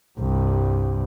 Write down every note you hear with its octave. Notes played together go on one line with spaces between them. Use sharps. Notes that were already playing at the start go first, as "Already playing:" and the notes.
C2 G2